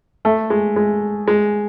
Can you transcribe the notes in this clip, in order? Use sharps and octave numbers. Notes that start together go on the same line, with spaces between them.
A3
G#3
G#3
G#3